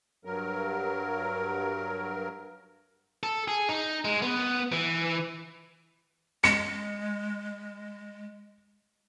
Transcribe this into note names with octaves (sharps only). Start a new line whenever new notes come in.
G2 F#3 A#4
A4
G#4
D#4
G#3
B3
E3
G#3 C#7